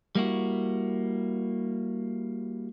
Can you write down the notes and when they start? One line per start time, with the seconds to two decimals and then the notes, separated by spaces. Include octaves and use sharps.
0.15 G3 A#3 E4 F#4